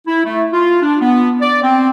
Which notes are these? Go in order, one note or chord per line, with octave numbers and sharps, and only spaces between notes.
E4
A3
F4
D4
B3
D5
C4